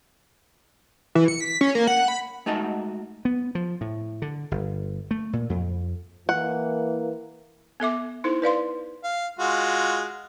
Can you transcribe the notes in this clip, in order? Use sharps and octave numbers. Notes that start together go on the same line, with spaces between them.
E3
C#7
B6
C#4
A#3
F#5
B5
G#3 A3 D#4 F#4 D#5 A5
B3
F3
A2
D3
G1
A3
A#2
F2
E3 A#3 F#5
B3 A4 E5 D6
D#4 E4 A4 C5
B4 D5 F5 C6
F5
G#3 F4 F#4